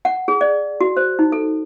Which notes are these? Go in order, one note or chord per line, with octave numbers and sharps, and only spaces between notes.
F#5
G#4
D5
F#4
C5
D#4
A4